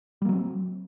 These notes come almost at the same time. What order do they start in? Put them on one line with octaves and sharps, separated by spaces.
G3 A#3 F#3 C4